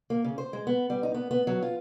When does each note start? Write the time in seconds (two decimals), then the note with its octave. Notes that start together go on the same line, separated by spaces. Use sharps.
0.10 A#3
0.24 C#3
0.38 C5
0.53 G#3
0.67 B3
0.90 G3
1.03 D#4
1.14 B3
1.31 B3
1.47 F#3
1.63 F4